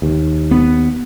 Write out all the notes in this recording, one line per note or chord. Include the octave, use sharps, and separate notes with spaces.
D#2
B3